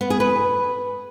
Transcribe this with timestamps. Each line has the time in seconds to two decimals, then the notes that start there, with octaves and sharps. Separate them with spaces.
0.01 B3
0.10 G#4
0.20 B4